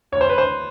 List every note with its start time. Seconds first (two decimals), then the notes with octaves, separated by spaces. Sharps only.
0.12 D2 C#5
0.21 C5
0.29 B4
0.38 C5